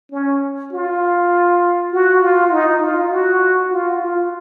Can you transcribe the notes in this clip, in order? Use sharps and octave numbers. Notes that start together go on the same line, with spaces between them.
C#4
F4
F#4
F4
D#4
F4
F#4
F4
F4